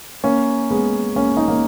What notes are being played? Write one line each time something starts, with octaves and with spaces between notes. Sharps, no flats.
A#3 C#4
G#3 B3
A#3 C#4
D#4
A#3 C#4